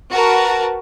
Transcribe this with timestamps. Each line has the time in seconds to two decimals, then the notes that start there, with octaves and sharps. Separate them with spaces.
0.12 F#4 A#4 B4 A5